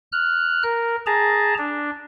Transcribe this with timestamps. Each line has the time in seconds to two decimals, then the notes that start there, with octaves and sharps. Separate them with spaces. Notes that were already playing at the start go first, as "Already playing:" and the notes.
0.12 F6 F#6
0.63 A#4
1.06 G#4 A5 A#5
1.58 D4